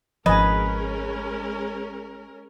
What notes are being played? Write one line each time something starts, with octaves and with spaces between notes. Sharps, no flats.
G#1 F3 G#3 C#4 A#4 B4 D#5 G#5